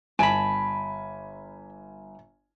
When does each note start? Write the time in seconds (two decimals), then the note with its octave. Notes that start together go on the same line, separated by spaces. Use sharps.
0.19 G1 G#5 A5 B5 D7